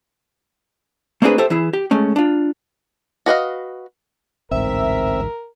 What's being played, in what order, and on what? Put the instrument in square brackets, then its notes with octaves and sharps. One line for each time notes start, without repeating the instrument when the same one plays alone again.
[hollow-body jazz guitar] A3 A#3 C4 D4 G#4 B4
G4 A4 C5 E5
E3 E4 G#4
G4
G#3 A3 C#4
D4 F4
[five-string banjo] F#4 B4 D#5 F5
[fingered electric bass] A1 D2 G#2 [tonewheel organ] C4 [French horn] A#4 [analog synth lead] E5